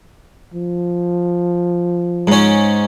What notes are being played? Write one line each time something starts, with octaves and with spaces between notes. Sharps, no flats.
F3
G#2 C#4